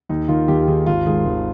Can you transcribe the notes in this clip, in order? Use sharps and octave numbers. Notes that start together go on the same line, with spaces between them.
D#2 D#4
D#3 F4
D#2 G4
D#3 G#4
G#1 F4
G#2 D#3 G#4
G#1